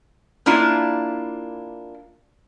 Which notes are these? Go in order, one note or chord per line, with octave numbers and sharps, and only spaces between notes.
A#3 D4 E4 F4